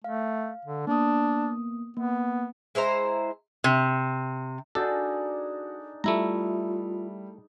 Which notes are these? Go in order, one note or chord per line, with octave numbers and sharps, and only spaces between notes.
A3 F5
D3
A#3 B3 D4 D#6
A#3 B3
G#3 E4 C5 A#5
C3
D4 D#4 F#4 G#4 A4
G3 A3 E4 F4 A#5